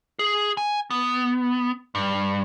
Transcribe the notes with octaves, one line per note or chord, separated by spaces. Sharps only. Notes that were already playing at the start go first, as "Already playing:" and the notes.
G#4
G#5
B3
G2